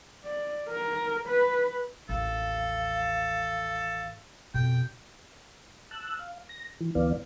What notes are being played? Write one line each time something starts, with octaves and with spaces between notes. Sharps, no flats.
D5
A#4
B4
A1 D#2 A4 F5
F2 B2 G5
A5 E6 F#6
F5
A#6
E3
D2 E3 B3 D5 F5